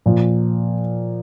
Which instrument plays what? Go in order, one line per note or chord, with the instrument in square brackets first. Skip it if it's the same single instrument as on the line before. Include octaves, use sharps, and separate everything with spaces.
[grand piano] A#2 F3